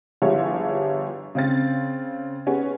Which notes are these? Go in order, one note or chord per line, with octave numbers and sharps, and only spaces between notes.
G1 F3 G3 E4 G#4 C#5
C#3 C4 A6
B3 C#4 G#4